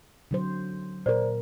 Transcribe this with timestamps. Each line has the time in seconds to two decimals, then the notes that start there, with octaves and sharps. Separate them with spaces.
0.31 D3 F#3 C5
1.06 A#2 A#4 C5 D5